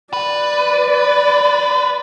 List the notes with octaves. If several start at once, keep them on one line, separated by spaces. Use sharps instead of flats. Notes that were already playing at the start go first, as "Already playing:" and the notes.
B4 D5